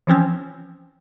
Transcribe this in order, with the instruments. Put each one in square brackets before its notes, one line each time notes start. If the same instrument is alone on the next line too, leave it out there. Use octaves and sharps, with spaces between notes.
[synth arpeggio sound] E3 F3 C4 C#4